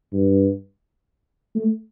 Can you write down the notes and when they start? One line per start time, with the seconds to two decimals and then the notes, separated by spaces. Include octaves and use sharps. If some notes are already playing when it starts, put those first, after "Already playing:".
0.13 G2
1.56 A3